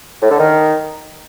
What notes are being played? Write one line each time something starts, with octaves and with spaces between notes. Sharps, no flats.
A2
D3
D#3